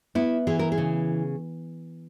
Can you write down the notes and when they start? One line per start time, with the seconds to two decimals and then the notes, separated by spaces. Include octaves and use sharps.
0.15 B3 E4
0.47 E3 G#4
0.59 A#4
0.72 G#4
0.78 C#3